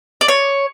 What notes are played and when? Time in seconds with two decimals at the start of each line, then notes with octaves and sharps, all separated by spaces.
0.21 D5
0.28 C#5